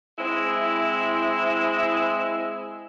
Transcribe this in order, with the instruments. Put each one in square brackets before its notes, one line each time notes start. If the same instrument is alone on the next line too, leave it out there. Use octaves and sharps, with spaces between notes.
[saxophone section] G#3 C4 E4